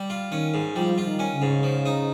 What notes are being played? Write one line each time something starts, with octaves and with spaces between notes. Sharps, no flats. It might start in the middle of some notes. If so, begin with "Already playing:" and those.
Already playing: G3
F4
D#3 C#4
G#2
F3 G3
F4
D#3
C#4
C#3
G#2
F3
D#4